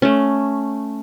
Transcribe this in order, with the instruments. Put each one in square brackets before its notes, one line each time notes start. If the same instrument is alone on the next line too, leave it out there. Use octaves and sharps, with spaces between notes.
[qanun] A3 C#4